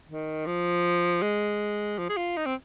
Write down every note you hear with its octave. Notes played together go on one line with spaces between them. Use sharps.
D#3
F3
G#3
F3
G#4
F4
D#4
C4